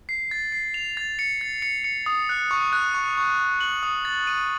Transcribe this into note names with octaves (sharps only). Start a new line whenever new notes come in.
C7
A6
C7
F7
A6
C#7
A6
C#7
C#7
D#6
F#6
C#6
F#6
C#6
C#6
C#6
F#7
D#6
A6
D#7